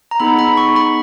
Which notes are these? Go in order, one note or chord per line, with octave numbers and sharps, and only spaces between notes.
A#5
B3 D#4 G#4 B5
B5
C#6
B5